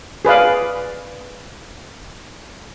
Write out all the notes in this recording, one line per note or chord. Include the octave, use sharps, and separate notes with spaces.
G#4 B4 D5 F5